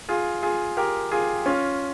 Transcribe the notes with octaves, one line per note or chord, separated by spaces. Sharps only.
F4 G#4
F4 G#4
G4 A#4
F4 G#4
C#4 F4